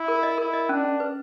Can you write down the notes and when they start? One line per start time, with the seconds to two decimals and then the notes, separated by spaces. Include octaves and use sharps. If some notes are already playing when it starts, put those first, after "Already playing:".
Already playing: E4
0.08 A#4
0.23 D#5
0.38 E4 A#4
0.53 D#5
0.69 C#4 D4
0.84 C#4
1.00 B4